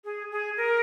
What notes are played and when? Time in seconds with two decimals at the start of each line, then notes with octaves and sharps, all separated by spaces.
0.05 G#4
0.31 G#4
0.57 A#4